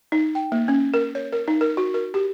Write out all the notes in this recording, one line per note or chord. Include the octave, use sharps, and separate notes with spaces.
D#4
G5
A#3
C#4
A#4
C#5
A#4
D#4
A#4
F#4
A#4
G4